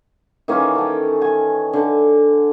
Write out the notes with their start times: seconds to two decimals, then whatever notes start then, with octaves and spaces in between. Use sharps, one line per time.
0.48 D#3 E3 A#3 C#4
0.75 A4 G5
1.22 G#5
1.73 D3